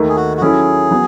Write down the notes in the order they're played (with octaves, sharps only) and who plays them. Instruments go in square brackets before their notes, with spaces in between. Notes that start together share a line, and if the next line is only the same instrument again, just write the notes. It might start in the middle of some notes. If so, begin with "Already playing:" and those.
Already playing: [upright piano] D#2 D#3 A3
[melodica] G#4
F#4
F#4
[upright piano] F#3 C#4 E4 A4 [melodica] G#4
[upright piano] F#3 B3